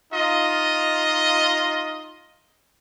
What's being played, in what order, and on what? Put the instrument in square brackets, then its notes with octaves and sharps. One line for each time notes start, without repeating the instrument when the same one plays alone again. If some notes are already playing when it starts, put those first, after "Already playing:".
[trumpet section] D#4 F4 D#5